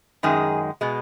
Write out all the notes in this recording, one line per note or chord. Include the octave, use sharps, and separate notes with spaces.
F#2 D#3 G#3 G#4
B2 G#3